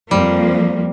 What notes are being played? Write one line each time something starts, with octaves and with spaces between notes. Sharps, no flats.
F2 F3 G3 A#3